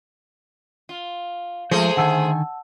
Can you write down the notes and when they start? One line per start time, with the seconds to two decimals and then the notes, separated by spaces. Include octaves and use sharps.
0.89 F4
1.71 F3 G#3 A3 G#4 C5
1.97 D3 D#3 F#5 G#5 A5 E6